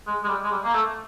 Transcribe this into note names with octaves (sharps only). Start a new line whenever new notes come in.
G#3
G#3
G3
G#3
G3
A#3
A3